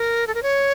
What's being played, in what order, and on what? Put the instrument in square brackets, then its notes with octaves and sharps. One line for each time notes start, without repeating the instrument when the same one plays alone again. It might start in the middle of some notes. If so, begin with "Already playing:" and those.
Already playing: [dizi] A#4
A4
A#4
C#5